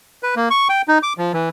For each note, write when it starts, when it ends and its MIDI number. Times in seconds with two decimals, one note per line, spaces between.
0.23 0.35 71
0.36 0.49 58
0.50 0.68 85
0.69 0.82 79
0.88 0.98 63
1.03 1.13 86
1.18 1.32 53
1.33 1.49 52